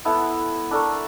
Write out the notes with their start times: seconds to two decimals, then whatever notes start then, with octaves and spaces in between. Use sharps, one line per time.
0.05 B3 E4 A4 F#5
0.71 D4 A4 A#4 C#6